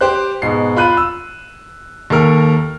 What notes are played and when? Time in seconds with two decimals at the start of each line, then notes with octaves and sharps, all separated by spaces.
0.01 G4 C5 F#6
0.42 G#2 B2 C7
0.76 F4 B5 F#6 D#7
0.97 E6
2.10 D#2 A4 A#4 F6